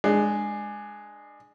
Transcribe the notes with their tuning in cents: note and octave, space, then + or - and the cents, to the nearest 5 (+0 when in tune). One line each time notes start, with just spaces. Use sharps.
G#3 +0 D4 +25